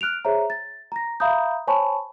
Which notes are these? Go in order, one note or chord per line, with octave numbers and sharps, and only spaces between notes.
F6 F#6 D7 F7
G#4 C5 C#5 E5 A#5
A6
A#5 A#6
E5 F5 A#5 B5 D#6 G6
C5 C#5 G#5 A5 B5 C#6